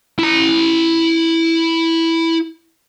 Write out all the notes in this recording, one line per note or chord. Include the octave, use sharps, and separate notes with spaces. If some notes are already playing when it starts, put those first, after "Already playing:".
E4 A#5